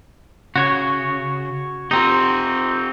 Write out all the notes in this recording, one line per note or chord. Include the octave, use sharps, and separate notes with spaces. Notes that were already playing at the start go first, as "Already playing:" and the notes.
C#3 F#4 C#5
C4 D#4 F4 G4